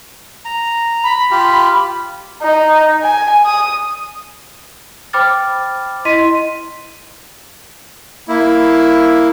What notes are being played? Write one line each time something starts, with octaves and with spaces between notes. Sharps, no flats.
A#5
B5
F4 G4
D#4
G#5
D#6
C5 G5 B5 D6 F6 A6
E4 D#5 C6 B6 D#7
A#3 E4